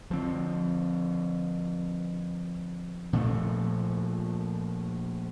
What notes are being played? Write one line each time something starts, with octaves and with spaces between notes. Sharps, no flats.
D3 F3 C4
A#2 F3 A3